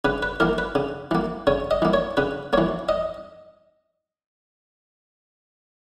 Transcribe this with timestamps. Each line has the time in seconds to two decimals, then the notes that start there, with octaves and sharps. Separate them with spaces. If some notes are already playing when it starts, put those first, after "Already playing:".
0.05 C#3 B4
0.23 B4
0.40 E3 A#3 A#4
0.58 B4
0.75 C#3
1.11 E3 A#3
1.47 C#3 C#5
1.71 D#5
1.82 E3 A#3
1.93 C#5
2.17 C#3 B4
2.53 E3 A#3 C#5
2.89 D#5